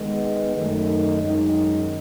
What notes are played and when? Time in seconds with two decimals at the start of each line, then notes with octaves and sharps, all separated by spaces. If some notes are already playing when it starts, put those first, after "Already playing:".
Already playing: D#3 G#3 B3
0.55 F#2 D#3 A3 D#4
1.21 F#2 D#3 G#3 D#4